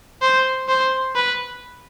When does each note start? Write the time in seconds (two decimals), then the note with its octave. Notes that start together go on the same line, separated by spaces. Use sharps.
0.22 C5
0.68 C5
1.16 B4